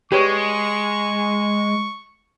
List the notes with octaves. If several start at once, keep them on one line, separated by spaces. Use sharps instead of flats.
G#3 G4 B4 C#5 C#6